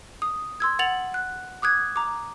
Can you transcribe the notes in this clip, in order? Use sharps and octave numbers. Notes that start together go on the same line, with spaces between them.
D#6
C6 E6 G#6
F#5 A6 F7 F#7
F#6
D6 D#6 F#6 G#6
A#5 D6